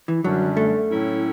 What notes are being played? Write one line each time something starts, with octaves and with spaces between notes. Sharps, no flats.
E3
F#2 D3 F#3 G3 D4
A3
A2 F#3 C#4 E4 A4